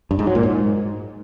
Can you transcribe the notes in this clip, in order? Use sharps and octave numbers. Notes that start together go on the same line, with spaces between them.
G2
G#2
F#3
A#2
G#2